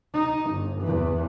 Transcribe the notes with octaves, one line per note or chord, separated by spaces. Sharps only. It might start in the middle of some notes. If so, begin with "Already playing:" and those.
D#4
G1
E2 E3